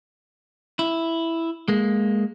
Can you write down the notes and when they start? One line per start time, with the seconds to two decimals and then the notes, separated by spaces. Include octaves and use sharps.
0.79 E4
1.68 G#3 A#3